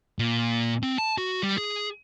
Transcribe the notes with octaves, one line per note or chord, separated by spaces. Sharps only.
A#2
C4
A5
F#4
G3
G#4